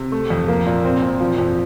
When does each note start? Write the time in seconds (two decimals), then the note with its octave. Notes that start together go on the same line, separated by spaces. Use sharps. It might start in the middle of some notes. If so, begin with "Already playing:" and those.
Already playing: C3
0.12 A3
0.30 F2
0.48 A#3
0.66 A#2
0.85 C4
1.02 A#2
1.21 F3
1.38 F2